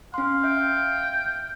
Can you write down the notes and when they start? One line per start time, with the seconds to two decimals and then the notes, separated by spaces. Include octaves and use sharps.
0.14 C#4 F5 C6
0.44 E5 G5